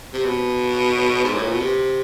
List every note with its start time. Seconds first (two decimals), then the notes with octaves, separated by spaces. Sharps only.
0.13 C3
0.24 B2
1.24 G#2
1.34 A2
1.43 A#2
1.52 B2
1.60 C3